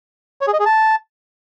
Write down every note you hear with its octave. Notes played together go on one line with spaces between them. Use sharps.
C#5
G#4
D#5
G#4
A5